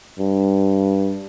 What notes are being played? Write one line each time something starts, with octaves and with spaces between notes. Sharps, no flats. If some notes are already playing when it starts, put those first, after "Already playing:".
G2